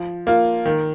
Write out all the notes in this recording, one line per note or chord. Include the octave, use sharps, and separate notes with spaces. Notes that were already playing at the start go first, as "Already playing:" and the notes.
Already playing: F3
A#3 F4
D#3